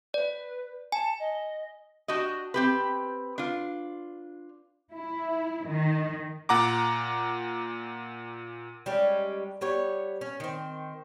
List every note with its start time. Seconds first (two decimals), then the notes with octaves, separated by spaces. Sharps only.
0.14 B4 D5
0.92 G#5 A5
1.19 D#5
2.08 D4 F#4 G4 D#5
2.54 C4 G4 B4
3.38 D4 F4
4.93 E4
5.68 D#3
6.49 A#2 F#5 A#5 D6
8.86 G3 G#3 C#4
9.61 G3 B3 C#5
10.21 C#4
10.40 D#3 C4